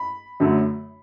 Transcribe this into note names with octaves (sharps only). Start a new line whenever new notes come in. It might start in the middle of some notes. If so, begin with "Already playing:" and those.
Already playing: B5
F#2 D3 F#3 A3